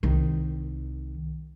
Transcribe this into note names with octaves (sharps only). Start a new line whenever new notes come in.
C2 D#3